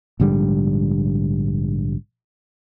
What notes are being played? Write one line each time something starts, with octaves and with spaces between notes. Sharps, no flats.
A#1 G#2 D3 G3